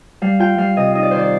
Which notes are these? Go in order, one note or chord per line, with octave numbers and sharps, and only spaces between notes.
G3 F5
F4 G5
G3 F5
C3 D#5
D#4 D#5
D5
D#3 C5
D5